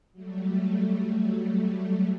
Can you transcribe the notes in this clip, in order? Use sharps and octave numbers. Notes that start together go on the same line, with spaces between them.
F#3 G3 A3